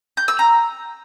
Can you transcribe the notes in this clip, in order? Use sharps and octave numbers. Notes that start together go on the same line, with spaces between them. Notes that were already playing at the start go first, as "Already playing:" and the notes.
G6
E6
A#5